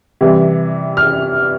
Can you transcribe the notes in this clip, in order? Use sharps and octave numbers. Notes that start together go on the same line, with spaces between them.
C3 E3 G3
F6